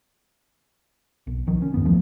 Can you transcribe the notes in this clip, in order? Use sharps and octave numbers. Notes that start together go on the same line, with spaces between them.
B1
C2 D#3 F3
C#4
E2 G2 B3
C2 E3 F3 A3